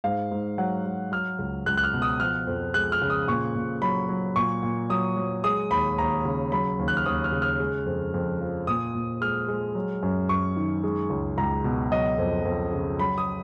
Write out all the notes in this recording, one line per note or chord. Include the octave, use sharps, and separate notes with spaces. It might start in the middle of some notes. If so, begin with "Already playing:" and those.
G#2 F5
G#2
F#3 F#5
F#3
F#3 F6
C#2
C#2 F#6
F#6
F6
B2
D#6
F3 F6
F2
G#3 F#6
F6
C#3
D#6
A#2 C#6
A#2
F#3 B5
F#3
A#2 C#6
A#2
F#3 D#6
F#3
G#3 D#6
D#2 B5
D#2 A#5
C#3
F#3 B5
D#2
F#6
F6
D#2 D#6
F6
C#3
F6
G#3
F2
F2
F3
A#2 D#6
A#2
G#3 F6
G#3
F#3
F#2
F#2 C#6
D#3
G#3
C#2
C#2 A#5
B2
F#3 D#5
F2
F2
C#3
F#3 B5
D#6